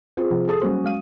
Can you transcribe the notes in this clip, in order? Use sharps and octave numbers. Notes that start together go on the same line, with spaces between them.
C4 F4 G#4
C3 F3
G#4 A4 D#6
F#3 G3 A#3 C#4 F#4 C5
G#3 F5 D#7